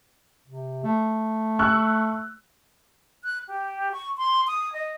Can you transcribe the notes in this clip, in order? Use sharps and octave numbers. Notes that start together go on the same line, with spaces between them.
C3
A3
C#6 E6 F#6
F#6
G4
C#6
C6
D#6
D#5